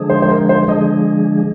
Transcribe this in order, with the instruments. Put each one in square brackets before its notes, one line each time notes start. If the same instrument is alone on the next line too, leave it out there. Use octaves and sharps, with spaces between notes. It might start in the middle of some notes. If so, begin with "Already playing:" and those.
Already playing: [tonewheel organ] D3 F3 G#3 D4 G#4
[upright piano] C5
C5
A#4
C5
[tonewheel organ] D3 F3 G#3 D4 G#4 [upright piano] D#5